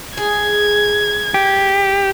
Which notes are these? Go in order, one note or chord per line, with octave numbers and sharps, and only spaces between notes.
G#4 G#6
G4